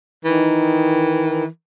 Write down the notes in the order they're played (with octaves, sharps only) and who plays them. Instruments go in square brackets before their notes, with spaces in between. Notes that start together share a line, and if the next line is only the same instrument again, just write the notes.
[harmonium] D#3 [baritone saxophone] E3